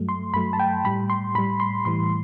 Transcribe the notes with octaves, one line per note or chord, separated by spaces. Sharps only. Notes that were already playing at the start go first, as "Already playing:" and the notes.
Already playing: G2 F#3 A3
C6
G2 F#3 A3 B5
A5
G5
A2 G3 B5
C6
A2 G3 B5
C6
A2 E3 G3 C6